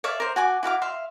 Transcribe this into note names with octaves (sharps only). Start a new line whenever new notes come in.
C#5 D5 E5 F5
A#4 C5
F#4 G#5 D6
E4 F#4 F5 D6
E5 F5 C6